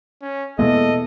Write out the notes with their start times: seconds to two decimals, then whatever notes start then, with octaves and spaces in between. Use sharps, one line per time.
0.22 C#4
0.59 E2 B2 G#3 A#3 A4 D#5